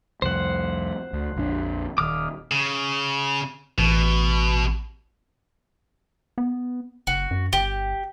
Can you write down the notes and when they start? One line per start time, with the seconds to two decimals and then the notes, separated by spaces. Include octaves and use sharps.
0.22 C2 F2 C5 F#5
1.13 D2
1.36 A#1 F2 D4
1.98 D#1 D#2 D6 D#6 F6
2.51 C#3
3.78 A1 B2
6.38 B3
7.07 F#1 F#4
7.31 F#2
7.53 G1 G4